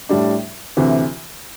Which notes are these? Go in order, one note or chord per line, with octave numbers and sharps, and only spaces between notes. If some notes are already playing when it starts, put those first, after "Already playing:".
A2 G3 D4
D2 C3 E3